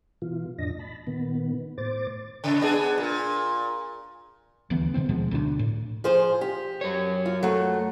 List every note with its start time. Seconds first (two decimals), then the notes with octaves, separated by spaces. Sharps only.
0.22 B2 E3 F4
0.58 F2 A2 D4 D#5 A#6
0.79 A5 B5
1.07 A#2 D#3 B3
1.78 A2 C5 D6 A6
2.44 C#3
2.61 B3 D4 G#4
2.98 A#2
4.70 D#1 D2 E3 B3
4.94 B2 D#3 B3 C4
5.09 D#1 B2 F3 G#3
5.31 D2 D4
5.59 A2
6.04 F3 G#4 C5
6.41 G4
6.81 F#2 C#5
7.26 F4
7.43 F#3 A3